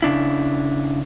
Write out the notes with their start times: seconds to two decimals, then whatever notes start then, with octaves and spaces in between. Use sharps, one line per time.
0.02 C#3 D4 E4